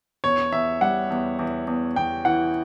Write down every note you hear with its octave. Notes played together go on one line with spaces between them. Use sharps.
E2 C#5
E2 E5
G3 F#5
E2
E2
E2
E2 G5
E3 F#5